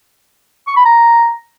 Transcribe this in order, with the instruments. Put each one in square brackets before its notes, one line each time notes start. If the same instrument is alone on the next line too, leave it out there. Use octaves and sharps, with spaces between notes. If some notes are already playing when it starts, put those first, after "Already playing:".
[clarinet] C#6
B5
A#5